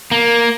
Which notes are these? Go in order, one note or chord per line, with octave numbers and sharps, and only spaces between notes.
A#3